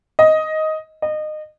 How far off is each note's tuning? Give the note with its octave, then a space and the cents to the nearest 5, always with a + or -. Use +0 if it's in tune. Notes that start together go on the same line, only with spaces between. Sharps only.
D#5 +10
D#5 -25